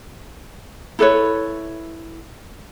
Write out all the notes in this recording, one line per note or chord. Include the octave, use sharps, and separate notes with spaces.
E4 A4 B4 C#5